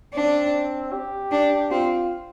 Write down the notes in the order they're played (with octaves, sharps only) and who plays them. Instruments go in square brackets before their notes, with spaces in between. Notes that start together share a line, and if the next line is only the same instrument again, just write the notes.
[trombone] C4 [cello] D4
[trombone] G4
[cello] D4
[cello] C4 [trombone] F4